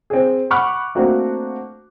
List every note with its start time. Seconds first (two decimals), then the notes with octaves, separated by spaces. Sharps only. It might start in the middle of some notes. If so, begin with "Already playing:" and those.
0.10 C4 G#4
0.51 F#5 B5 C#6 D6 F6 F#6
0.95 A3 A#3 C4 D4 F#4